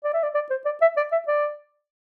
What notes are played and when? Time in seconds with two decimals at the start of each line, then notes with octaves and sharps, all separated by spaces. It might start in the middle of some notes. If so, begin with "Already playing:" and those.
0.04 D5
0.14 E5
0.23 D5
0.34 D5
0.50 C5
0.65 D5
0.81 E5
0.97 D5
1.12 E5
1.27 D5